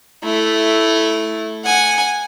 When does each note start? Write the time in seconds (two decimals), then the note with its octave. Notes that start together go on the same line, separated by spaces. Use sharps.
0.24 A3 E4
1.65 F#5 G#5